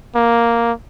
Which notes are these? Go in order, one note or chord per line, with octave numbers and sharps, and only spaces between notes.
A#3